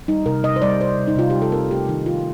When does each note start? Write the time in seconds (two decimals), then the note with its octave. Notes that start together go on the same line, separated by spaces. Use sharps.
0.08 G3 D#4
0.26 C3 A#4
0.44 C3 D#5
0.56 C5
0.62 G3 D5
0.80 C3 C5
0.98 C3
1.07 D#4
1.16 C3 F4
1.30 G3 G4
1.42 A4
1.52 C4 A#4
1.70 A3 G4
1.89 D#3 D#4
2.06 D#3 F4